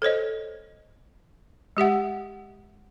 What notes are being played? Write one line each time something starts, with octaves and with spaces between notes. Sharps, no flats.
A4 C5 C#5 D#5
G#3 G4 E5 F#5